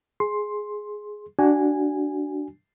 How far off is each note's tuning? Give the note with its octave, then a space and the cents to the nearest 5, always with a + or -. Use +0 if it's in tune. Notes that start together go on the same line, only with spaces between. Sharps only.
G#4 +5 C6 +10
D4 +0 F#4 +20 G#5 -10